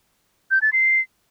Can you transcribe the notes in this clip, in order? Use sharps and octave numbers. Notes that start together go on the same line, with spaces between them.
G6
A6
C7